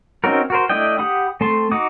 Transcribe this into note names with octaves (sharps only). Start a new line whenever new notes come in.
C4 C#4 D#4 F#4 A#4
F#4 A#4 C5
A3 D4 E4 D#5 G5
G4 F#5 B5 D#6
A3 C4 A5 C6
D#4 F#4 F#5 D6 D#6